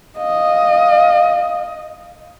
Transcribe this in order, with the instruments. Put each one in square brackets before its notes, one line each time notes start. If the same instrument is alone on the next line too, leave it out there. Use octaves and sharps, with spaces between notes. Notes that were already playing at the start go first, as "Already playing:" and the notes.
[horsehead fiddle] D#5 [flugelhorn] F5